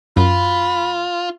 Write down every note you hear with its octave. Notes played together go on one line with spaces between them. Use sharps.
F#2 F4 B5